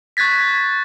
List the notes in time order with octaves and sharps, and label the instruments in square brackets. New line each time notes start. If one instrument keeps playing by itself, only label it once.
[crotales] C#6 F#6 G#6 A6 B6